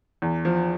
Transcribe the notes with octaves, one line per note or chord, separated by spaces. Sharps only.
E2
F3